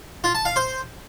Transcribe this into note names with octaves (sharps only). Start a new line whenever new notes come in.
F4
A5
F5
C5